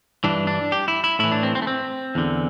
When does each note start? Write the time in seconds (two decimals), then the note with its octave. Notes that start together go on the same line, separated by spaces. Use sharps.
0.24 G2 E3 D4
0.47 D4
0.72 G4
0.88 E4
1.04 E4
1.19 A2 E3 E4
1.32 D4
1.43 C4
1.55 C4
1.62 A3
1.67 C4
2.15 E2 D3